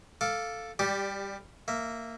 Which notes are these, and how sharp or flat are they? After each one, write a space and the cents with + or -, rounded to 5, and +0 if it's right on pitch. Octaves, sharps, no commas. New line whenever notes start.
A4 +0 F5 +0 D6 +0
G3 +20 G4 +0 D5 +0
A#3 -15 E5 +0